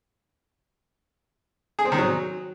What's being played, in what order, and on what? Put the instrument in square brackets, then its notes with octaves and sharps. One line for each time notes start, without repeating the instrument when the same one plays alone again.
[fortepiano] G#4
C4
D#3
F#3